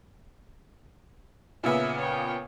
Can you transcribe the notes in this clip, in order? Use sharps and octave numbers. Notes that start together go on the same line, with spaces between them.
A#2 C#3 B3 E5
C#5 G5